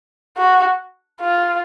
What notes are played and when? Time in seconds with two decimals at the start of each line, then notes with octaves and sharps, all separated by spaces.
0.37 F#4
1.21 F4